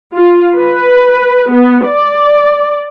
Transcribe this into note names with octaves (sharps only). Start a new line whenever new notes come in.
F4
B4
B3
D5